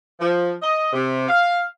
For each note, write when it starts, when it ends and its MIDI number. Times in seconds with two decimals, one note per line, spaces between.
0.20 0.53 53
0.63 0.92 75
0.93 1.25 48
1.29 1.61 77